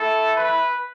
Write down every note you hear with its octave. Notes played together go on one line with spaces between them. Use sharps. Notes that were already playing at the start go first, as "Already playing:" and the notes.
Already playing: A3 E4 A4
B4